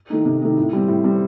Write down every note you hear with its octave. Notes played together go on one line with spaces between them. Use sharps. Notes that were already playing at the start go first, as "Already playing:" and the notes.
D#3 A3 D#4
C3
D#3 A3 D#4
A2
G3 C4
A2
G3 C4